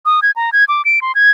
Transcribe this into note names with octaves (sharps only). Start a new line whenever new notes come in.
D#6
G#6
A#5
G#6
D6
D7
C6
G#6